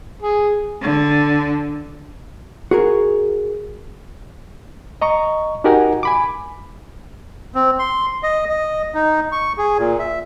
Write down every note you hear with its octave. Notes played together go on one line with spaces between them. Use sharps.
G#4
D3
F#4 G#4 A#4
D#5 A#5 C#6
D#4 F#4 G4 A#4 F#5 G#5
G#5 B5 D6
C4
C6
D#5
D#5
D#4
C#6
G#4
A#2
E5